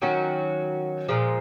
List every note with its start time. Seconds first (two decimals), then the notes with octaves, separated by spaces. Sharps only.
0.02 D#3 F#3 C#4 F#4
1.08 A#2 F3 G#3